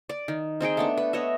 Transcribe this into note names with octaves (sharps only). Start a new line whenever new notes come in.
D5
D#3
C4 D#4 G#4 G5
A3 B3 D4
B4
B3 C#5 D#5 E5